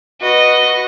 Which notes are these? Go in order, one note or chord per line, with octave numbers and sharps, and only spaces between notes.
F#4 B4 D#5